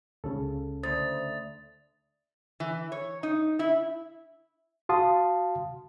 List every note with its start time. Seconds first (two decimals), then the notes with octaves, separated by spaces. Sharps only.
0.24 C#2 C#3 C#4 A4
0.83 D2 C5 D#6 A6
2.60 E3
2.92 C#5
3.23 D#4
3.59 E4
4.89 F#4 F5 A5 C6 D#6